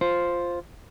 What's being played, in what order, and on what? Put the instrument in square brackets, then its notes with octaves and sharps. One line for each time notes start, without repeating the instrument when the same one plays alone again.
[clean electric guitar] F4 C5